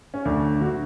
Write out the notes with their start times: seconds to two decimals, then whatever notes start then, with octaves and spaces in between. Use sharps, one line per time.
0.14 C#4
0.25 D2 D4
0.61 D3 F#4